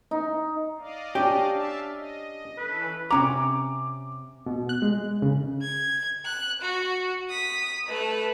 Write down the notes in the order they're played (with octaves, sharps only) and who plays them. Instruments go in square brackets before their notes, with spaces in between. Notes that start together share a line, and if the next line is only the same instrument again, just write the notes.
[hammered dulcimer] D#4
[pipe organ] D5 D#5 F5
[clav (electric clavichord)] C#4 D4 [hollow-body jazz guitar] G4
[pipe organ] E5 F5 A5
D#5
[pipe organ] E3 C#4 A4 [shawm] B4
[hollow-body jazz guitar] C3 C#4 A#5 [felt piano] D6
[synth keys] B2
F#6
G#3
C#3
[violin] G#6
F#6
F#4
D#6 B6
A3 B4